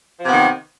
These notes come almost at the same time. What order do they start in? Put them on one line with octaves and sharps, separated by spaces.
F3 C3 B3 D#3